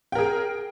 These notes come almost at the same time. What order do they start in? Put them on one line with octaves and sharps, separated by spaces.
G5 A#4 G#4